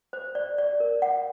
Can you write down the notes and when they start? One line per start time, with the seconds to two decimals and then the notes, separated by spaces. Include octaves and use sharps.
0.13 C5
0.35 D5
0.58 D5
0.80 A#4
1.02 F#5